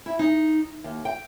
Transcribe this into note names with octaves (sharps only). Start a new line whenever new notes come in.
E4
D#4
D#2
G5